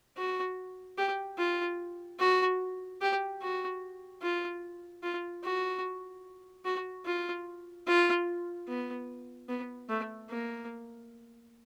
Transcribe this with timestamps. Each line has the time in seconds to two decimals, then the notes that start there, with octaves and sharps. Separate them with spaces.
0.17 F#4
0.98 G4
1.39 F4
2.19 F#4
3.01 G4
3.41 F#4
4.22 F4
5.03 F4
5.43 F#4
6.65 F#4
7.06 F4
7.87 F4
8.68 B3
9.48 B3
9.89 A3
10.29 A#3